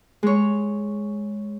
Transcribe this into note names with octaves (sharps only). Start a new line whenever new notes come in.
G#3 C#5